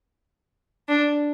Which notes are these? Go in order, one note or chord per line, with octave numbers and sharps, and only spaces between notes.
D4